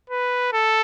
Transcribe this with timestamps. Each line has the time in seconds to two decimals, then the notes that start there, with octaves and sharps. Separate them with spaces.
0.10 B4
0.52 A4